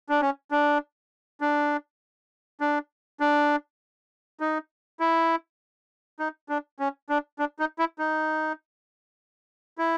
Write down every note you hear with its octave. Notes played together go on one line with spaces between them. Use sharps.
D4
C#4
D4
D4
D4
D4
D#4
E4
D#4
D4
C#4
D4
D4
D#4
E4
D#4
E4